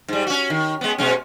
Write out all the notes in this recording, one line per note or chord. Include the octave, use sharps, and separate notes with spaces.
G#2 G3
C#4 F#4
D#3
G#3 B3
B2 G#3 C#4